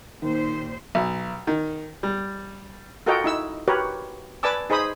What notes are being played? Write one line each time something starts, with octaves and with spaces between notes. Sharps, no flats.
D#2 A#2 D#3 C5
B1
D#3
G3
F4 F#4 A4 A#4 D#5 G5
D#4 E4 E6
F#4 G4 A#4 B4 C#5
B4 D5 G#5 A5 D6 E6
D#4 G#4 C5 B5 D#6